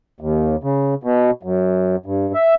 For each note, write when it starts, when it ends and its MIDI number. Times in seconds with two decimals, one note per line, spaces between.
0.21 0.56 39
0.63 0.94 49
1.03 1.31 47
1.43 1.96 42
2.06 2.32 43
2.34 2.54 76